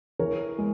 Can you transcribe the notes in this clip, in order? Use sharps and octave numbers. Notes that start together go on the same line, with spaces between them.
E3 A#4 C#5
G#3